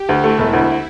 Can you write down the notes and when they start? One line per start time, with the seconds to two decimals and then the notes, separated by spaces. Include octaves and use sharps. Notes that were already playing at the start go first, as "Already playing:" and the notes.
Already playing: G4
0.09 D2
0.24 A3 E4
0.38 E1
0.53 D2